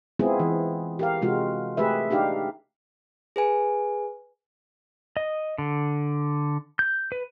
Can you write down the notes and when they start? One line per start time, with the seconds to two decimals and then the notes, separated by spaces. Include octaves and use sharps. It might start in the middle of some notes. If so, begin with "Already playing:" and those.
0.19 G#3 B3 C4 E4 F4 G#4
0.40 E3
0.99 G4 A#4 F5
1.22 C3 G#3 F4 F#4
1.77 A3 G4 G#4 B4 E5
2.10 D4 D#4 G4 F5
3.36 G#4 B4 G#5
5.17 D#5
5.58 D3
6.79 G6
7.12 B4